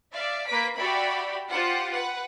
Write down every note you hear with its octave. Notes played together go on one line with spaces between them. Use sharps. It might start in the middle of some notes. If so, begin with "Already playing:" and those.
D5 E5 F5
A#3 B4 B6 D7
F#4 G4 D5 E5 B5
F4 G4 C5 F#5
B4 F#5